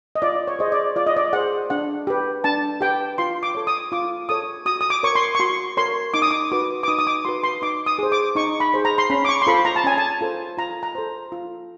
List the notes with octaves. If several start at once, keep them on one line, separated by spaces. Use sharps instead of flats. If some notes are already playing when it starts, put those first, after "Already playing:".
D#5
F4 D5
C#5
G#4 C5 D#5
D5
F4 D5
D#5
D5
G#4 C5 F#5
D4 F#5
G4 B4
D4 A5
G4 B4 G5
F4 C6
D6
A4 C#5
D#6
F4 D6
A4 C#5 D#6
F#4 D#6
D#6
D6
A#4 C#5 C#6
C6
C#6
F#4 C6
A#4 C#5 C6
D#4 D6
D#6
D6
F#4 B4 D6
D6
D#4 D#6
D#6
D6
F#4 B4 C6
C6
D#4 D6
D#6
G#4 C5
D6
D#4 C#6
B5
G#4 C5
A#5
C6
C#4 B5
D6
C#6
C6
F4 A4 C5 B5
A#5
A5
C#4 G#5
A5
F4 A4 C5
F4 A#5
A#5
A4 C5
F4